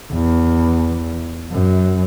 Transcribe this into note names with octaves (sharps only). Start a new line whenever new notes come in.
E2
F#2